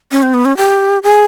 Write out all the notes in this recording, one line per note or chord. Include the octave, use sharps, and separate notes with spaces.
C#4
C4
B3
C#4
G4
G#4